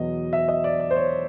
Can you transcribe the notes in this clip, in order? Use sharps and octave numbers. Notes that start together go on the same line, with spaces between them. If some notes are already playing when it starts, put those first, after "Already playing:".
Already playing: E2 B2 F#3 B3 D#5
E5
D#5
D5
D5
C5
C#5